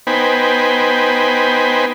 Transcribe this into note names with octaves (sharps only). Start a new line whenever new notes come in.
B3 D#4 C5 G5 G#5 B5